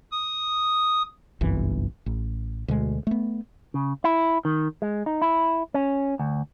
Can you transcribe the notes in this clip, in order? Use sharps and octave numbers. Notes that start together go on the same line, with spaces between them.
D#6
G1 C2 F#2 E3
A1
D2 B2 G#3
A3 B3
C#3
E4
D#3
G#3
D#4
E4
C#4
D2